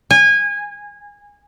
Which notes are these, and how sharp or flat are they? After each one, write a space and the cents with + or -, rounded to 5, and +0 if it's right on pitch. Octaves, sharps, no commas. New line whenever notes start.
G#5 -25